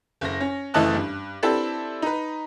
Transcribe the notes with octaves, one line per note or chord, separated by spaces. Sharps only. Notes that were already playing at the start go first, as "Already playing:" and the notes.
F#1 A#6
C#4
F#1 E3 A3 D#5 A5 F#6
G2
C4 D4 E4 G4 A4 B4
D#4 B4